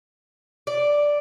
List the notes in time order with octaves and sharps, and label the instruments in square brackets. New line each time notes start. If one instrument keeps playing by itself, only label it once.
[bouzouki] D5